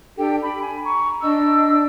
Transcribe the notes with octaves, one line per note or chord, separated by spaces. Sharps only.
D4 G4 A4 G5
B5
G#5
A#5 C#6
D4 D#5 E6